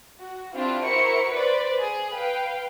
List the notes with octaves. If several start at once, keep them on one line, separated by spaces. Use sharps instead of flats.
F#4
C4 D4 E4 F4 G4
E4 F#4 A#4 C5 C#6 C#7
B4 C5 D5
G#4
B4 F5 G5